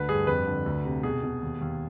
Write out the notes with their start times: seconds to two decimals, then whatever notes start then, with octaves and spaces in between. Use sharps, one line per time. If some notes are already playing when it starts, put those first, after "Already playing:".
Already playing: D2 D3 B4
0.08 G2 G#4
0.27 F2 B4
0.46 D3
0.66 D2
0.85 C3
1.03 B2 G#4
1.23 B2
1.42 D#2
1.61 D#2